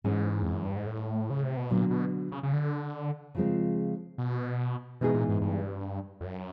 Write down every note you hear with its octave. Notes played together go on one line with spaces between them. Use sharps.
G#2 E3 G#3 C#4
F2
F#2
G2
G#2
A2
C#3
C3
B2
A#2 D3 F#3 B3
B2
C#3
C#3
D3
C#3 F3 G#3 C4
B2
B2 E3 G#3 B3 D#4 G#4
A#2
G#2
G2
F2
F#2